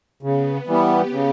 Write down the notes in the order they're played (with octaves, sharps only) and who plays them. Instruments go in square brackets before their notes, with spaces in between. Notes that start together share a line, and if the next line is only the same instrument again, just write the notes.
[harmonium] C#3 [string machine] B3
[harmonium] E3 G3 B3 [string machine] G4
[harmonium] C#3